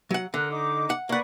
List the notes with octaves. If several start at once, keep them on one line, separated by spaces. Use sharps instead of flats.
F#3 F#5
D3 A#4 F#6
D#4 D6
F#5
A#3 B4 D5 F#5 C#6